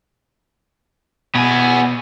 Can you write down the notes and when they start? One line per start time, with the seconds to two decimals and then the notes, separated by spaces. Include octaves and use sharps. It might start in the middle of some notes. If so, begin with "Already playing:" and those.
1.35 B2 B3 G#5